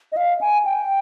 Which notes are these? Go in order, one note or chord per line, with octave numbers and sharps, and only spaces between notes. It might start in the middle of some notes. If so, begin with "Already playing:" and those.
D#5
F5
G#5
G5